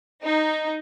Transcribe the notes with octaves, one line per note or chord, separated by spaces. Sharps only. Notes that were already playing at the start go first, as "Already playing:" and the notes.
D#4